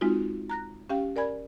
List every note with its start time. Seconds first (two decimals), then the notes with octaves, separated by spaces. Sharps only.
0.01 G#3 C4 D#4 F4 F#4
0.50 A#5 F#6 A#6
0.90 C#4 G4 F5 G5
1.16 A#4 D5 G#5 B5 G#6